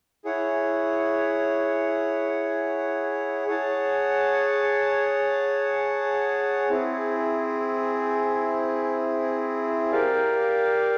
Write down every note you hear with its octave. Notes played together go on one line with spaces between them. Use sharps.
E4 G#4 C#5 F#5
G#4 C#5 F#5 A5
C4 E4 G#4
G4 A#4 D5 F5